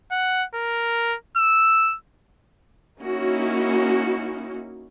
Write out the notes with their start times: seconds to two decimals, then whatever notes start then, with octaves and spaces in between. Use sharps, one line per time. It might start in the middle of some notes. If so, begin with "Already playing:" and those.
0.11 F#5
0.55 A#4
1.37 E6
3.01 A#3 C#4 D#4 E4 F#4